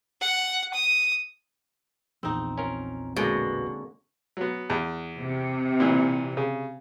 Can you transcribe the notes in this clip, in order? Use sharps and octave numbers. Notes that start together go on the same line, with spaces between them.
F#5
D#6
A#1 E2 A#2 C4 D#4
C#4 F4 A#4
B2 D3 G#3 A#3 C#4 F#4
F#3 B3
E2
C3
A#2 E3
C#3